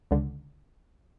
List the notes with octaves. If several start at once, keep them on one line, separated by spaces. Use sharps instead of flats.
C#2 D3